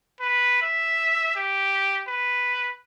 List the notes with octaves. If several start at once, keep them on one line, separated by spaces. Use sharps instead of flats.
B4
E5
G4
B4